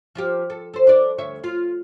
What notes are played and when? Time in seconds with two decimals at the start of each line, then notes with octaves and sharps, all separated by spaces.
0.15 F3 F4 G4
0.50 A4
0.74 A4 C5
0.87 D4 D5
1.18 D2 C#5 E5
1.44 F4